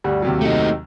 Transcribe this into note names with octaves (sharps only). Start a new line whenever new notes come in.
D2 G2 G3
D#2 C3 F#3
A3 D#4